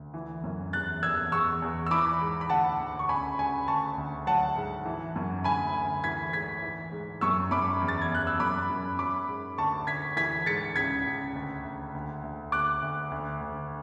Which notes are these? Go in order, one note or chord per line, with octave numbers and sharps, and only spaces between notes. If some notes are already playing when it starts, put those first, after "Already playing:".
Already playing: D2
E3
F#2
E2 F#6 A6
E2 E6 G#6
E2 C#6 E6
E2
E6
E3 B5 D6
G#2
B5
D2 F#5 A5
D2
C#6
C#2 G#5 B5
C#2 G#5 B5
D2 A5 C#6
D2
F#3 F#5 A5
G#2
E3
F#2
D2 G#5 B5
D2
E3 G#6 B6
G#2 G#6 B6
E3
G#2
F#2 C#6 E6
F#2 B5 D6
E2
A6
G#6
E2 F#6
E6
F#2 B5 D6
F#2
F#3 B5 D6
G#2
D2 A5 C#6
D2 G#6 B6
E3 G#6 B6
G#2 A6 C#7
C#2 G#6 B6
C#2
D2
D2
D2
D2
D2 D6 F#6
D2
D2
D2